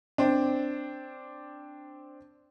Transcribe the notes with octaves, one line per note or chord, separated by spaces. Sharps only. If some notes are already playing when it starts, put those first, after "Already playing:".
C4 D4